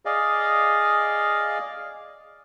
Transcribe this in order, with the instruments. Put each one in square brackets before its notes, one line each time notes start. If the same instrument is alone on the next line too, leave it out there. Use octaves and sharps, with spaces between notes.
[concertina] G#4 D5 D#5 F5